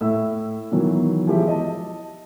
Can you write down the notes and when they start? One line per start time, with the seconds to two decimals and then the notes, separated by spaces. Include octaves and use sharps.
0.01 A2 E4 E5 E6
0.71 B2 D#3 E3 F#3
1.27 E3 F3 G#3 G4 E5
1.47 D#5 A5